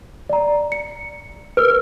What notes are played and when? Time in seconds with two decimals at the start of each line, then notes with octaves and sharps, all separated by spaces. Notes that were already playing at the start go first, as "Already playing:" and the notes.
0.29 D5 A#5
0.72 C#7
1.57 A#4 B4 E6 F6